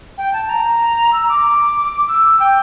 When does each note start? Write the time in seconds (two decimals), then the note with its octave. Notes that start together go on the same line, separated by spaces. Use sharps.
0.18 G5
0.33 A5
0.49 A#5
1.13 E6
1.29 D6
2.08 E6
2.40 G5